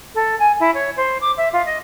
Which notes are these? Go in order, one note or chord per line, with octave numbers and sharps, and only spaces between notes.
A4
G#5
E4
C#5
C5
D6
E5
F4
D#5